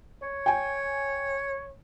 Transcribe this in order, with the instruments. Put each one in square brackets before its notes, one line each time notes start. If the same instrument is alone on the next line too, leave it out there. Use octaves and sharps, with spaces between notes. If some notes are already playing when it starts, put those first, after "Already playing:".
[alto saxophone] C#5
[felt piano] G5 G#5